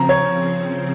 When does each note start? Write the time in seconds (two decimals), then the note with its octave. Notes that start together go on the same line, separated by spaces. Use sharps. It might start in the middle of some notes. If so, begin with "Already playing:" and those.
Already playing: C#3 F3 C4 A#5
0.09 C#5